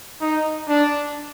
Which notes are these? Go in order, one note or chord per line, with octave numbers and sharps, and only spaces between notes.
D#4
D4